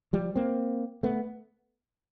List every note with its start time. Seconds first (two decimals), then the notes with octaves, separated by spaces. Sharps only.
0.13 F3 G3
0.36 A#3 C4
1.03 A3 B3